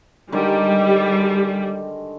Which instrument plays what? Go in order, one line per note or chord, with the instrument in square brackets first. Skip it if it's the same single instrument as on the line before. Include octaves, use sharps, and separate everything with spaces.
[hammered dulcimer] D3 D#3 G#3 [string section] G3